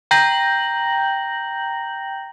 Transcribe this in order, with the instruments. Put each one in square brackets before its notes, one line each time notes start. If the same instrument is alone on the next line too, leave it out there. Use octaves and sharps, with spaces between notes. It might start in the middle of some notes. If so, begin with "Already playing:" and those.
[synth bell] G5 A#5 G6 A#6 F#7